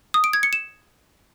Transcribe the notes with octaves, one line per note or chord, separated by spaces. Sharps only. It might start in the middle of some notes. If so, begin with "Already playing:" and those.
D#6
D7
G#6
C#7
E7